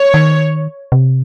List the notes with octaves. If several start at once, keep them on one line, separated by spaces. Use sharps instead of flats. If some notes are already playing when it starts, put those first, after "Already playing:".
Already playing: C#5
D#3
C3